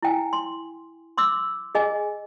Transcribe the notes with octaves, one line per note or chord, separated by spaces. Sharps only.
E4 G5 G#5
C6
C6 D6 E6
G#4 D#5 G#5